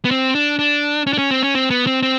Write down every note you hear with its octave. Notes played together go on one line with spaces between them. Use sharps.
B3
C4
D4
D4
C#4
D4
C#4
C4
C#4
C4
B3
C4
C4